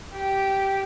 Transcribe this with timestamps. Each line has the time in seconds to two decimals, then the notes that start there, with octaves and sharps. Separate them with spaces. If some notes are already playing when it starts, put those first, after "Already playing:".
0.12 G4